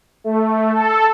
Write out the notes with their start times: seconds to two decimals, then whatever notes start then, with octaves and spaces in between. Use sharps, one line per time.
0.24 A3
0.72 A4